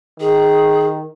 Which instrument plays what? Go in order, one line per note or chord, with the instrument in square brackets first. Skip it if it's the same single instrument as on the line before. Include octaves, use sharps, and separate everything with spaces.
[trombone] D#3 [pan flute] G#4